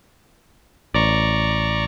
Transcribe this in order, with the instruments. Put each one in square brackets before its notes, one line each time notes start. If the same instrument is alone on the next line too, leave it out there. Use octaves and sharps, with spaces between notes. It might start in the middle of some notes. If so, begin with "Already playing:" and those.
[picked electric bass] A1 [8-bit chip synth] D5 A#5 C#6